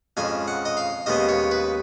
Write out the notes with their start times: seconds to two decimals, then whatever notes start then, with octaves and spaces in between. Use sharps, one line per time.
0.17 F2 C#3 G#3 G#5
0.47 F#5
0.65 D#5
0.77 F5
1.06 D#2 C#3 G#3 B3 D#5
1.29 C#5
1.51 B4